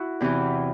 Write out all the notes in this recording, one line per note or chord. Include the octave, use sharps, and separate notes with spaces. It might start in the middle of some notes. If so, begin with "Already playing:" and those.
Already playing: E4 F#4
E2 C3 E3